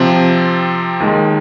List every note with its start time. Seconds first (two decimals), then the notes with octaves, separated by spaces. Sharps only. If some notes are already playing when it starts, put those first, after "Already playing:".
Already playing: C3 F3 C4
1.00 D#2 D#3 G#3